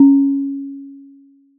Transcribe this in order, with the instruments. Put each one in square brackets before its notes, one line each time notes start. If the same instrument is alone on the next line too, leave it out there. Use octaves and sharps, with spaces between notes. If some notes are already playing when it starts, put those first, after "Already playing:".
Already playing: [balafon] C#4